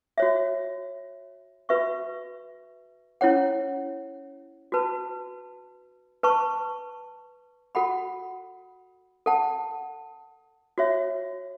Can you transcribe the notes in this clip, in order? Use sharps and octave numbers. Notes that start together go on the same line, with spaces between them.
F#4 C#5 E5
F#4 B4 E5 C#6
C#4 E4 C#5 F#5
F#4 B4 A5
B4 A5 C#6
F#4 A4 F#5 B5
A4 F#5 A5
F#4 C#5 E5